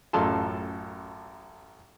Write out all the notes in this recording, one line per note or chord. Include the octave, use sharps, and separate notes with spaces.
A1 F#2 F4 A4 A5 C6